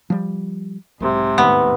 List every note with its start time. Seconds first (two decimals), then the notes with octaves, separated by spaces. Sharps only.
0.10 F3 G3
1.00 B1 G#2 C3
1.38 D#1 A2 D#3 B3